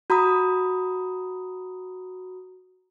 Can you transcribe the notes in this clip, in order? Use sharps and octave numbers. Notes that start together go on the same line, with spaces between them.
F#4 A#5 B5 D#6